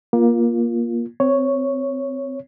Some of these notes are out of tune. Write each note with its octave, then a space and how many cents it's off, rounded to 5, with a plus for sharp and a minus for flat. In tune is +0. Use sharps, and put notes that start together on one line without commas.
A#3 +20 F4 +0
C4 -20 C#5 +0